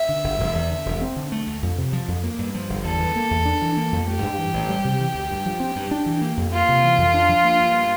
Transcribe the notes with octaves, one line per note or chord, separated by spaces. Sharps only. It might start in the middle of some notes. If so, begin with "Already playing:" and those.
Already playing: E5
D3
G1
E1
E2
D3
E1
C4
D3
A3
D2
F2
C3
F3
F2
A#3
G2
F3
G1
E2 A4
E3
A#3
E2
D4
E3
A#3
F2
A3 G4
G2
E3
A1
G3
C3
E3
D2
G2
F3
C4
G2
D4
E3
A#3
F2
A#3 F4
C3
E3
F2
D4
F3
A#3
G2